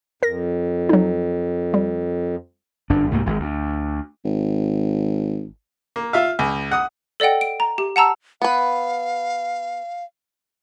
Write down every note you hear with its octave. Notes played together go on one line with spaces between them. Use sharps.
F2 A#4 A#6
F#3 D#4
G3
G1 F#2 D4
C2 G#2 A3 A#3
G#1 G#3
D2
G#1
A#3
F4 E5 F5
C#2
F#5 D#6
A4 D5 D#5 F#5 G5
D7
A#5
G4
F#5 A5 A#5 E6
B3 B4 F5